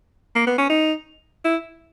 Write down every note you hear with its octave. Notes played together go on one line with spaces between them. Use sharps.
A#3
B3
C#4
D#4
E4